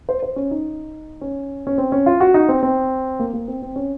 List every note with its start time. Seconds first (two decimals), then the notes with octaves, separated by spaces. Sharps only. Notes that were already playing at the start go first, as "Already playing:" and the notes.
0.09 C5
0.23 C5
0.36 C#4
0.51 D#4
1.21 C#4
1.67 C#4
1.78 C4
1.92 C#4
2.06 F4
2.21 F#4
2.34 D#4
2.49 C4
2.63 C4
3.19 A#3
3.34 A#3
3.48 C4
3.62 C4
3.76 C#4